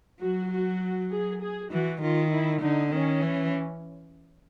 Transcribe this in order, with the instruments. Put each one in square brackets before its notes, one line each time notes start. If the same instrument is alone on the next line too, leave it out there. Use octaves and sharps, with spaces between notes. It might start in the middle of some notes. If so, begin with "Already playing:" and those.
[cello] F#3 [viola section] F#4
[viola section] F#4
G#4
G#4
[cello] E3 [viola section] F#4
[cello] D#3 [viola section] F4
[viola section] E4
[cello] D3 [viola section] D#4
[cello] D#3 [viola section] C#4
[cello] E3